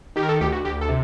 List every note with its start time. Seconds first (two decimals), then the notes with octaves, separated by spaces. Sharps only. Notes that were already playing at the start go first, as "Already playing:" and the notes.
0.16 D#3 G4
0.23 A#4
0.29 A4
0.41 D2 G4
0.52 F#4
0.65 D2 G4
0.81 A4
0.89 C3